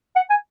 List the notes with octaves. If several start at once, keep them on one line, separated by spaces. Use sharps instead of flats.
F#5
G#5